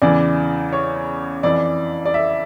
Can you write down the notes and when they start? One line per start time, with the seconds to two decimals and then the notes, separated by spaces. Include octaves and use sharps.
0.02 E2 C#3 E3 D5
0.73 C#5
1.43 F2 E3 D5
2.05 D5
2.14 E5